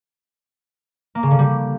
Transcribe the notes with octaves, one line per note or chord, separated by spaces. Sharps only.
A#3
C#3
D3
G3